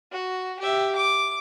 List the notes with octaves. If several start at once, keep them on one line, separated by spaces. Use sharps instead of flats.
F#4
G4 E5
D6